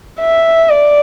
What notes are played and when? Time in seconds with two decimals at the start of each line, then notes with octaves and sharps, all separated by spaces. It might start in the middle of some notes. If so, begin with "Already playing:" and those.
0.20 E5
0.69 D5